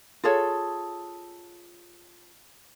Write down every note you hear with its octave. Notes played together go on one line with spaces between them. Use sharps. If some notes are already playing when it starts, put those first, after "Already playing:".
F4 G#4 A4 C#5